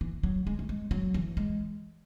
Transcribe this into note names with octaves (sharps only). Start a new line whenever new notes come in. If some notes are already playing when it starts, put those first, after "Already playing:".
E3
F#3
G#3
A3
G#3
F#3
E3
G#3